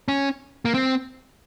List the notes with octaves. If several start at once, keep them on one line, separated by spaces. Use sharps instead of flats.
C#4
A#3
C4